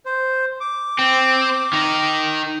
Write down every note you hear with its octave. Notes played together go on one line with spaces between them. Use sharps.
C5
D6
C4
D#3 D#4